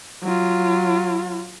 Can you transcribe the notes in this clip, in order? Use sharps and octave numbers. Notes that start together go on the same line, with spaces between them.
F#3 F4